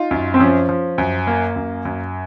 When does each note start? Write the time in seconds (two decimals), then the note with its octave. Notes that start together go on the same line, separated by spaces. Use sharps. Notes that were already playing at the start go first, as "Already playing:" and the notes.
Already playing: D#4 F4
0.11 F#2
0.34 C4
0.39 F3 C#4
0.69 F3
0.98 F#2
1.27 A#3
1.56 F#2
1.85 F#2